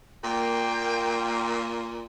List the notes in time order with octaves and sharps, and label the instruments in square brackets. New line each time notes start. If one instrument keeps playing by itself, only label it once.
[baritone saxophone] A#2 [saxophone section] A#3 [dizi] G5